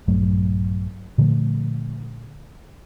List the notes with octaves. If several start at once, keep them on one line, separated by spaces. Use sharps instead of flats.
A#1 G2 F#3 A3
A#2 D3 F3 A3